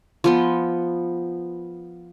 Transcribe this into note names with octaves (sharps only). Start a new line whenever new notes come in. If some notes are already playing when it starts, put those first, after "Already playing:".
F3 B3 C6